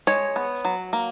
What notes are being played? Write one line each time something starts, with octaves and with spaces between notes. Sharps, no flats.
G#3 C#5
B3
F#3
A#3